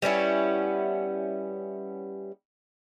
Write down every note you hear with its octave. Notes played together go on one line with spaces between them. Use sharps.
G3 B3 C#4 E4